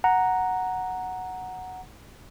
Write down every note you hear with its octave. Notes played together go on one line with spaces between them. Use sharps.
F#5 A#5